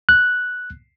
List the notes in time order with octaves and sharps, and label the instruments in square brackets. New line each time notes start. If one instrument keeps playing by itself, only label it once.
[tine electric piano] F#6